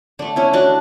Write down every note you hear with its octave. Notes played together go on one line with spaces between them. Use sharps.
D3 A3 D4
C#4 E4
D4 F#4